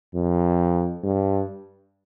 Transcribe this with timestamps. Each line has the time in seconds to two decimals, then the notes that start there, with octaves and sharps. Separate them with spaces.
0.15 F2
1.04 G2